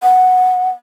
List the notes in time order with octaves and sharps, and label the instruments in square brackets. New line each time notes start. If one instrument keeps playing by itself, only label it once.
[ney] F#5